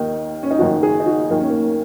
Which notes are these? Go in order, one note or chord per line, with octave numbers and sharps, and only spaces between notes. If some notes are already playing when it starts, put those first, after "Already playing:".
Already playing: D#2 D#3 D#4
C#4
D#4
F#1 F#2 D#3 F#4
G#4
D#4
F#4
D#2 D#3 A#3
C#4
A#3